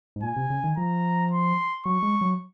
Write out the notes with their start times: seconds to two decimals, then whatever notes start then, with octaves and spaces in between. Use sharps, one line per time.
0.16 G#2
0.23 A#2 G#5
0.36 C3
0.50 C#3
0.64 D#3
0.77 F3 A#5
1.31 C6
1.85 F#3 C#6
2.03 G#3
2.21 F#3